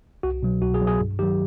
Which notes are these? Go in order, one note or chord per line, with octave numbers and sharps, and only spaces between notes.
C2 F#4
B2 F#3
C2 F#4
G#4
B2 F#3
G#4
G2
D#3 F#3 G4